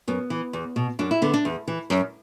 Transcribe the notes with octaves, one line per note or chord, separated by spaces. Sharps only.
F#2 B3
E3
E2
B2
F#2 D4
E4
D3 B3
D4
E2
E3
F#2